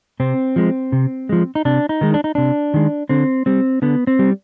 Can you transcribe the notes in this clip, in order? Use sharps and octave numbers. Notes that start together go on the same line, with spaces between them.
C3 C4
F3 G#3
C3
F3 G#3
D#4
C3 D4
D#4
D#3 G#3
D4
D#4
C3 D4
D#3 G#3
D3 C4
G3 C4
D3 B3
C4
G3